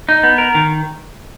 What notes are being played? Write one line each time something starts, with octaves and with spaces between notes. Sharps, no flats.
D#4
B3
A#4
D#3